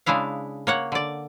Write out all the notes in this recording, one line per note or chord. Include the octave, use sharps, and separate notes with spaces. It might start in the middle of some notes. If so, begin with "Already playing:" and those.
C#3 G#3 D4 E4 F5
A#3 C#5 F#5
D3 D5